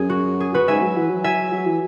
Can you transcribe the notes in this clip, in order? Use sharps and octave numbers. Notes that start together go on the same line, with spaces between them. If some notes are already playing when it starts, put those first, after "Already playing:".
Already playing: F#2 G#4
F#4
G#4
F#4 B4
G#2 E5 G#5
F#3
E3
F#3
E5 G#5
F#3
E3